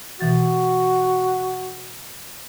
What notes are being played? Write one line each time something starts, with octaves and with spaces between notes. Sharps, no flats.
B2 E3 F#4 A6